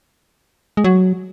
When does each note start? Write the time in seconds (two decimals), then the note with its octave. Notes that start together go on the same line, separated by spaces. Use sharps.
0.77 G#3
0.84 F#3